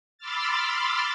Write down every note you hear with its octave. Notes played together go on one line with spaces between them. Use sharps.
B5 C6 D6 E6 F6 A6